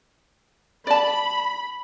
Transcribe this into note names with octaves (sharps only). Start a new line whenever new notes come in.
D5 A5 B5